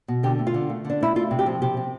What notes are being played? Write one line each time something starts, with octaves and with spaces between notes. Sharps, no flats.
B2
D3 G4
A3
F4
D3
A3
D3 D4
A3 E4
A3 F4
C3
G4
F3
C3 G4
C3